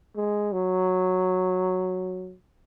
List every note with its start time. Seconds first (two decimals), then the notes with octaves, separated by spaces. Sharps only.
0.16 G#3
0.52 F#3